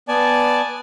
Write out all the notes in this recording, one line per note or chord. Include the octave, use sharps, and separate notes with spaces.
B3 D5 G#5 A5